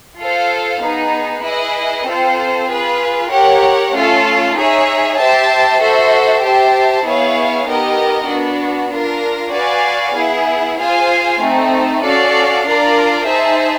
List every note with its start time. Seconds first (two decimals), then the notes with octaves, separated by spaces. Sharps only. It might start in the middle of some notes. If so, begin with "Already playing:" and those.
0.19 F4 A4 C5 F5
0.82 B3 D#4 G#4
1.44 E4 G#4 B4 D#5
2.06 C4 F4 A4 C5
2.68 F4 G#4 B4
3.30 G4 A#4 C#5 F#5
3.94 A3 C#4 F4 A4
4.56 D#4 G#4 C#5 E5
5.17 G4 C5 E5 A5
5.80 F#4 A4 C5 E5
6.43 G4 C5 E5 A5
7.04 B3 E4 G#4 C#5 F5
7.67 B3 D#4 G4 A#4 D#5
8.28 B3 D4 F#4
8.91 D4 F4 A#4
9.53 F#4 B4 D5 F5 G#5
10.15 B3 E4 G#4
10.78 F4 G#4 C5 F5 G#5
11.40 A3 C4 D#4
12.02 C#4 F#4 A4 D5 F5
12.65 D4 F4 A#4 D5
13.27 D#4 G#4 C5 E5 A5